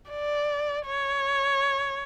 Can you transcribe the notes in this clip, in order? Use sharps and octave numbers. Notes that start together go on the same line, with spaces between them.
D5
C#5